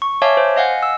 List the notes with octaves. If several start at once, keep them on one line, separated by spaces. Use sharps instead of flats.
C#6
C#5 E5 F5 G#5 A5 D6
C5
D#5 F5 F#5 G#5
E6